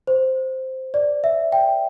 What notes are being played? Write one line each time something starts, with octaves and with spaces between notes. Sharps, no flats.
C5
D5
E5
G5